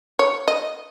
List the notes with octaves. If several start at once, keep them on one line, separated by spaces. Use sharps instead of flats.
C#5
D#5